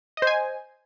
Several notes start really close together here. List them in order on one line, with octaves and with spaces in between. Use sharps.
D#5 C5 G#5